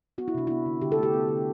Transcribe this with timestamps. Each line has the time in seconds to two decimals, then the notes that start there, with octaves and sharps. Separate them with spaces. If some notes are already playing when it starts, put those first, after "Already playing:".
0.18 B3 F#4
0.28 E4
0.34 C3 D4
0.47 B3 E4
0.66 D3
0.82 D3 G4
0.92 A4
0.98 A3 G4
1.13 B3
1.29 D3